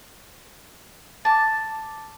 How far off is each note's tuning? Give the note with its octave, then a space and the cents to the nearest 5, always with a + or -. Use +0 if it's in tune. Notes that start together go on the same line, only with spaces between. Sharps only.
A5 +0 D6 +0